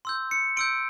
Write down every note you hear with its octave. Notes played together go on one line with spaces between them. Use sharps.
C6 E6 G6
C#7
C6 E6 G6 D7